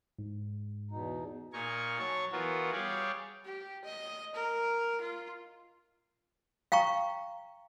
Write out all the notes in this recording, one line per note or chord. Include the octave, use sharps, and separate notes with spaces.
G#2
E2 B2 D#4
A#2 D#4 A#4 G#5 C#6
F#3 C#5 A5 C#6
E3 B3 F4 F#4 A#4
G3 G4 G#4 C#5 D5 F5
G4
D#5
A#4
F4
F5 G5 A#5 C#6